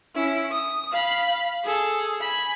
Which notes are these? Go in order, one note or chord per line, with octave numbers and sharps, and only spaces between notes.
C#4 E4
D#6
F5 B5
G#4 A4
G#5 B5